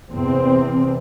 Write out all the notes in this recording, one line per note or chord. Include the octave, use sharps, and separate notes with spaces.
E2 C3 C4